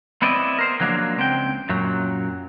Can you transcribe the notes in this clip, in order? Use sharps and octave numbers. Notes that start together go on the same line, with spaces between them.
B3 C4 E4 D5 D#5
A#4 C5
D3 F3 F#3 G#3 A#3 D4
C#2 C4 G5
F#2 A#2 F#3